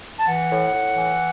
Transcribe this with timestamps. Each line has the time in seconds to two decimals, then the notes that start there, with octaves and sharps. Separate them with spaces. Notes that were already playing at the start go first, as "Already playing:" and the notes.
0.19 A5
0.27 E3 F#5
0.50 A2
0.74 A2
0.96 E3